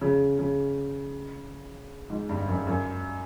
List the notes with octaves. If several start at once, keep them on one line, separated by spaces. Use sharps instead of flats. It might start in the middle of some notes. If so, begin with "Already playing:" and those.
C#3
C#3
G#2
G2
F#2
F#2